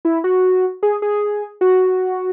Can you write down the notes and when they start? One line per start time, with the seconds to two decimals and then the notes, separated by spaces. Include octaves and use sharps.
0.05 E4
0.24 F#4
0.83 G#4
1.02 G#4
1.61 F#4